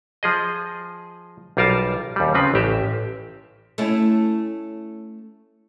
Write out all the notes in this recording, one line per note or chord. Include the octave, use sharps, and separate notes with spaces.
F3 G#4 D#5
B1 G3 F4 A#4 A5
D#2 G3
C#3 F3 C4 B4
A1 G4 E5
A3 C#4 E4